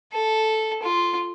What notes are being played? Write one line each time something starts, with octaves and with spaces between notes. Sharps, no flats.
A4
F4